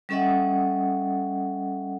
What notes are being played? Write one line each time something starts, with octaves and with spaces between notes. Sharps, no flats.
G3 C#4 A4 D#5 E5 F#5